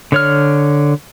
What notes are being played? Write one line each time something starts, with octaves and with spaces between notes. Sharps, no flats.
D3 C#5 F6